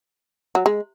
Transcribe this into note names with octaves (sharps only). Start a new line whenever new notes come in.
F#3
G#3